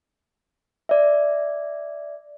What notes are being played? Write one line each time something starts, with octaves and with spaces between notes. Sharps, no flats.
D5 E5